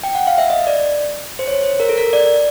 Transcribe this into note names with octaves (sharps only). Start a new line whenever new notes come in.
G5
F#5
F5
E5
D#5
D5
C5
C#5
C5
A#4
A4
A#4
D5